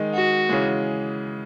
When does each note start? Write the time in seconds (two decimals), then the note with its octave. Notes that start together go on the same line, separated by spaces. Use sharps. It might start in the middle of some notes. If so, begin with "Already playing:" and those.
Already playing: D#3 G#3 D#4
0.14 F#4
0.49 C#3 E3 G#3